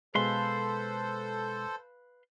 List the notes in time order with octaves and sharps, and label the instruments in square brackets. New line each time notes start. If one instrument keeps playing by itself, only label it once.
[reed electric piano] B2 G#3 [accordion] A4 C5 [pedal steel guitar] B4 F5 C6